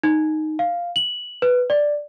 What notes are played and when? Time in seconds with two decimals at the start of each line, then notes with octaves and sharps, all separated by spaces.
0.03 D#4
0.59 F5
0.96 F#7
1.42 B4
1.70 D5